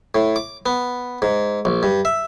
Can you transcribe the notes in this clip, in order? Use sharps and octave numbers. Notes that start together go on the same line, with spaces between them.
A2
D6
B3
G#2
A#1
G2
E5